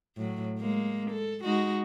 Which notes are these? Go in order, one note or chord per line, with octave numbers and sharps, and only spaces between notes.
A2 F#3
G#3 A#3
A4
G#3 D#4 F#4